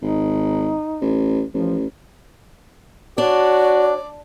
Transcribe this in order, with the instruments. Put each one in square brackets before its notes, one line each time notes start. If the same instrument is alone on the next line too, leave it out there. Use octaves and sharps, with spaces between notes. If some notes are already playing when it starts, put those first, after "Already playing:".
[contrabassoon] G#1 [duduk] D#4
[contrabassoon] A1
[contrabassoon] A1 [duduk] F3
[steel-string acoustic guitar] D4 [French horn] F#4 [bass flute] C#5 [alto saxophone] D5